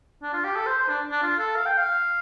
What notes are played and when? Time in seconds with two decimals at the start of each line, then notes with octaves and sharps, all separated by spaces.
0.22 D4
0.33 F4
0.44 G4
0.56 A4
0.67 C5
0.78 C5
0.89 D4
1.12 D4
1.23 F4
1.38 A4
1.56 F5
1.66 G5
1.77 F5